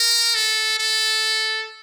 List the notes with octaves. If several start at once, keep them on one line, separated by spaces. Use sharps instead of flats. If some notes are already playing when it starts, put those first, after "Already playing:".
Already playing: A#4
A4
A4